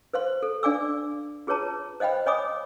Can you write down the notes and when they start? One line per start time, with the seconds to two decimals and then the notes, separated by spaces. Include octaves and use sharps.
0.14 B4 C5 F5 C6
0.43 A4
0.63 D4 D5 F5 G#5 D6 E6
1.47 F4 G#4 B4 C#5 A5 A#5
2.00 C5 D#5 F5 G5 B5
2.26 C#5 D#5 G#5 B5 D6 D#6